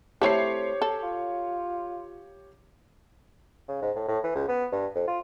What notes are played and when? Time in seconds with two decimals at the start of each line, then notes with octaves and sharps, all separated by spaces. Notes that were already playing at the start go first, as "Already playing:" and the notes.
0.22 A3 C4 E4 G4 A4 C#5 C7
0.82 A4
1.03 F4
3.69 C#3
3.82 G#2
3.96 A2
4.08 A2
4.24 E3
4.35 C#2
4.48 B3
4.72 G2
4.95 F2
5.08 F4